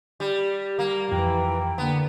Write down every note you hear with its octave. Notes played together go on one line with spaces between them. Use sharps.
G3
G3 A#3
F2 E3 F3 G5
D3 A#3 B3